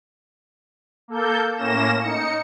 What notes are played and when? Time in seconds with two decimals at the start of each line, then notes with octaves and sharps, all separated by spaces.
1.08 A#3 A4 G6
1.57 A2 A#3 C#4 A#6 E7
2.00 D#4 C#7